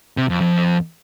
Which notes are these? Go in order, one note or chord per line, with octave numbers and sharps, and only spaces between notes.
C3
F2
F2